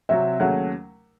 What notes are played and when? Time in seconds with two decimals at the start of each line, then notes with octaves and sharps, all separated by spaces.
0.09 C3 F#3 C4 F#4 E5
0.39 D#2 C#3 F#3 A3 C#4 F#5